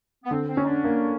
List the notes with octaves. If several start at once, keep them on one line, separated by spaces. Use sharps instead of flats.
B3
D3 C4
C4
C#4 D#4
D4
A#3